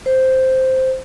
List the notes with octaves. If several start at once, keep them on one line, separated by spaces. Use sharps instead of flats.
C5